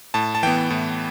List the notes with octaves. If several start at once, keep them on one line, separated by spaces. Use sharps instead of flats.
A2 A5
A5
E3 B3 G5
A2